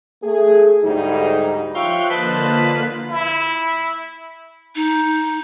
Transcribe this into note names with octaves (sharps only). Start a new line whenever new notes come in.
A3 G#4
D2 G#2 G3 D#4
F3 F4 C#5 E5 G5 F#6
D3 A#3 F4 B4 C5 D#5 A5
E4
D#4